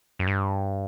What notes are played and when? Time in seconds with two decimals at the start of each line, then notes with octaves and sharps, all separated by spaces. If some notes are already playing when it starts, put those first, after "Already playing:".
0.19 F#2
0.27 G2